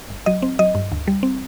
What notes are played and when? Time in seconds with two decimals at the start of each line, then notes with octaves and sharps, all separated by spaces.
0.10 G1
0.26 F#3 D#5
0.42 C4
0.59 F#3 D#5
0.75 G2
0.92 D2
1.07 G3
1.23 C4